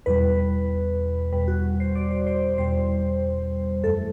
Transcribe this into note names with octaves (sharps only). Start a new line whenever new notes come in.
E2 B2 G3 B4
E2 B2 G3 B4
F#4
F#4
C5
D5
C5
C5
E2 B2 G3 C5
F#2 E3 A3 A4